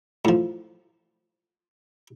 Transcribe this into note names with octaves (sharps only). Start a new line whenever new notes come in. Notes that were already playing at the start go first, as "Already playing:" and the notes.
A2 F3